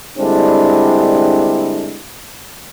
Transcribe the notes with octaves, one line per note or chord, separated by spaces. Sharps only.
D3 G3 G#3 C4 D4 E4